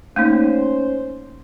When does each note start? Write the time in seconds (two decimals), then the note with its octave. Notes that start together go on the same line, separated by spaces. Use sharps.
0.16 A3 A#3 C#4 D#4 C5